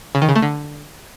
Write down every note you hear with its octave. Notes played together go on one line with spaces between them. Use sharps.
C#3
D#3
C#3
A3
D3